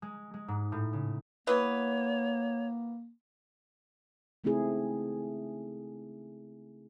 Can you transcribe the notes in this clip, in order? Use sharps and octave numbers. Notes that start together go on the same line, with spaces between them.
G#3
G#3
G#2
A2
C#3
E3 A#3 B3 C#5
C#3 A3 C4 D#4 E4 G#4